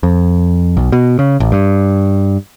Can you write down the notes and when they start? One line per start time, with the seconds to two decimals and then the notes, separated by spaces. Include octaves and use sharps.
0.03 F2
0.77 B1
0.92 B2
1.19 C#3
1.40 A1
1.52 G2